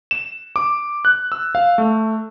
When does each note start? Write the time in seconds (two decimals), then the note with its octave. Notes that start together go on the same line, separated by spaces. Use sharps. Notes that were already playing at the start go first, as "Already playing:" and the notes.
0.11 E7
0.56 D6
1.05 F#6
1.32 E6
1.55 F5
1.78 A3